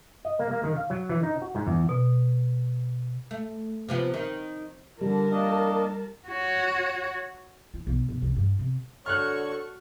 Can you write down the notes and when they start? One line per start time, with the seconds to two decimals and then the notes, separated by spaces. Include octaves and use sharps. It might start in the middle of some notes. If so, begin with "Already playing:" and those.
0.25 D#5
0.39 A#3
0.51 A#3
0.64 D#3
0.76 F5
0.90 F#3
1.09 E3
1.23 D#4
1.42 F#4
1.55 G#2
1.67 E2
1.89 B2
3.31 A3
3.89 C3 F3 B3
4.14 D#3
5.01 D3 G3 A#4 A5
5.31 A#3 D4 D#5
6.28 F#4 C#5
7.74 E4
7.87 B1
8.09 B1
8.22 C2
8.36 G2
8.59 C3
9.06 D3 F#4 A4 C#5 C#6 F6 F#6